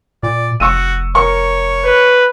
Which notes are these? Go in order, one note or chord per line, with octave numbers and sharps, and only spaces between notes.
A#2 D5
F1 F#4 C#6 E6 D#7
A#4 C#5 C#6
B4